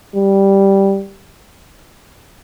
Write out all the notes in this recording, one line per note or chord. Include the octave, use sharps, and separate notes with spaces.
G3